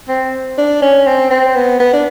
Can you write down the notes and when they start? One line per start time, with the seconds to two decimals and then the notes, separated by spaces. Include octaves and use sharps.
0.08 C4
0.58 D4
0.82 C#4
1.07 C4
1.31 C4
1.55 B3
1.80 B3
1.93 D4